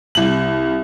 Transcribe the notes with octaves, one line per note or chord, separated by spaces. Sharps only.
C2 F#7